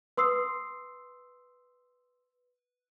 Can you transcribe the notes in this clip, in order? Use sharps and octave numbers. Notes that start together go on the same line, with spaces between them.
B4 C6 D#6 E6 C7